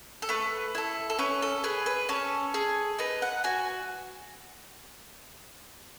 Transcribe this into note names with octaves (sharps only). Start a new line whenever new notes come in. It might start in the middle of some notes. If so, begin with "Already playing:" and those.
A4
A3 B4
E4 A4
A4
C#4 B4
A4
G#4 B4
B4
C#4 A4
G#4
D#4 B4
F#5
F#4 G#5